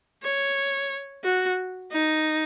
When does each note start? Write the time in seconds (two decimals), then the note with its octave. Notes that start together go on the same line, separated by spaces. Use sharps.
0.23 C#5
1.24 F#4
1.91 D#4